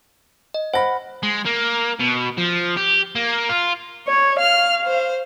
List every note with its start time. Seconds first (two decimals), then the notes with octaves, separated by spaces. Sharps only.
0.54 D#5
0.74 C5 F#5 B5 A#6
1.23 G#3
1.45 A#3
2.00 B2
2.37 F3
2.77 G4
3.15 A#3
3.49 F4
4.08 C#5
4.40 F5 F6
4.86 C5